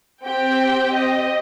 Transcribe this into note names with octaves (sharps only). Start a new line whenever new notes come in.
C4 G4 G5
D#5